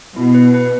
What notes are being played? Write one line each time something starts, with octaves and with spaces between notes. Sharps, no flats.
B2 E4
B4
B4